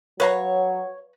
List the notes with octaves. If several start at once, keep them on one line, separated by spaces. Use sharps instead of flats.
F#3 B4 C#5 F5 A#5